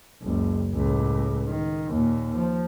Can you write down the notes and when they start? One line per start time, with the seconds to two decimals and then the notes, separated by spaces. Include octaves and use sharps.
0.23 F#1 C#2
0.75 C#2 A2
1.48 D#3
1.89 D#2 A#2
2.37 F3